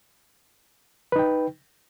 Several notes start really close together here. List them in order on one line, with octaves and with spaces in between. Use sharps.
B4 D#4 G5